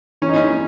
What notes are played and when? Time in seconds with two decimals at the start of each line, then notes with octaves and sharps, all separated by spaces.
0.22 E3 C#4
0.29 D#4
0.36 C#4